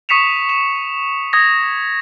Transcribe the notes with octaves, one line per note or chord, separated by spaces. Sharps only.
C#6 D#6 B6 C#7 E7 F7
E7
D#6 G#6 A#6